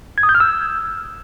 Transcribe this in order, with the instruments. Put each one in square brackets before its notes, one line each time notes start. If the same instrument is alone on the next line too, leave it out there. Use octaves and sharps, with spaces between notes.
[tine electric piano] G#6
D#6
G6
F6
E6